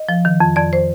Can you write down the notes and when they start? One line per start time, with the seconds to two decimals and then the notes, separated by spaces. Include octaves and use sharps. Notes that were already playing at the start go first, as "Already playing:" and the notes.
Already playing: D#5
0.09 F3
0.25 D#3
0.40 F2
0.56 F2 D5
0.73 C5